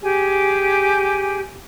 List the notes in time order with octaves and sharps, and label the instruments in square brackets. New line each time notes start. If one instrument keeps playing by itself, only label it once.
[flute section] G4 G#4 G#5